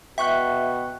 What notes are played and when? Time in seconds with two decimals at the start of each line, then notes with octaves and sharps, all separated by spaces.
0.18 B2 E5 G5 C#6 F#6